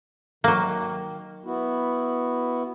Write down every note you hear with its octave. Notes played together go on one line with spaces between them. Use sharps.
D#3 F#3 A#3
B3 E4 F#4